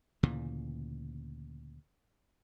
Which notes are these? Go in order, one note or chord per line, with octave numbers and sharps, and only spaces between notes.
D2 A#2 C#3 E3